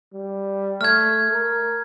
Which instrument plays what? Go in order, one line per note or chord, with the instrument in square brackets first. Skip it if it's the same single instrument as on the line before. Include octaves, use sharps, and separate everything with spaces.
[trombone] G3
[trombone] A3 [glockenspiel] F6 G#6
[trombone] A#4